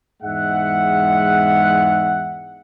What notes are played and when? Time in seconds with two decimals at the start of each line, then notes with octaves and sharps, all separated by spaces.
0.23 E2 G#2 G#3 E5 F#5